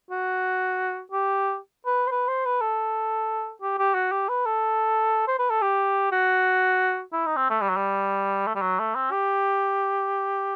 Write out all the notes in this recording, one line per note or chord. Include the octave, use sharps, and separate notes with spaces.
F#4
G4
B4
C5
B4
C5
B4
A4
G4
G4
F#4
G4
B4
A4
C5
B4
A4
G4
F#4
E4
D#4
C4
A3
G3
F#3
G3
A3
G3
F#3
A3
C4
G4